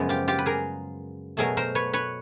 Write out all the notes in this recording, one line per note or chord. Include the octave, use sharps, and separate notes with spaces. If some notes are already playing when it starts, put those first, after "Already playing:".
Already playing: F#2 C#3 F3 G#3 B3
F4 G4
F4 G4
B4
G#4 A#4
B2 F#3 A3 G#4 A#4
A#4 C5
B4 C#5
B4 C#5